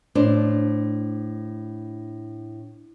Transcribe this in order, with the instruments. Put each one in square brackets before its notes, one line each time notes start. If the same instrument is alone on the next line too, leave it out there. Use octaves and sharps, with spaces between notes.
[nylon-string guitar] A2 D4 C5